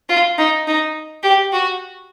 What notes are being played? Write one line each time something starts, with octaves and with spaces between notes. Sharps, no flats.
F4
D#4
D#4
G4
F#4